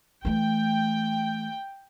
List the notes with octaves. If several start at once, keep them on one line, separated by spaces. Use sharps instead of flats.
E3 A3 G5